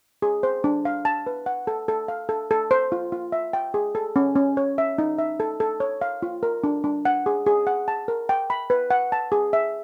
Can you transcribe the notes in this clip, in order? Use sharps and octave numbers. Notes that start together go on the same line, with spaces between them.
G#4
C5
D4
F5
A5
B4
F#5
A4
A4
F5
A4
A4
C5
F4
F4
E5
G5
G#4
A4
C#4
C#4
C#5
E5
D#4
E5
A4
A4
C#5
F5
F4
A#4
D4
D4
F#5
G#4
G#4
F#5
A5
A#4
G5
B5
B4
F#5
A5
G#4
E5